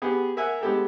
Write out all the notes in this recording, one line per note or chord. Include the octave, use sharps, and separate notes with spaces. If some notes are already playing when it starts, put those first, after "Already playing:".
B3 G4 G#4
A#4 E5 F#5 G#5
G#3 B3 G4 A4